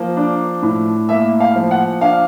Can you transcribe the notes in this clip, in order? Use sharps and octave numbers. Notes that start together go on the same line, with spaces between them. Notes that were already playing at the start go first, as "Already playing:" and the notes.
Already playing: F3 A#3
D4
A2
A#3 E5
F5
F3
F#5
D4 F5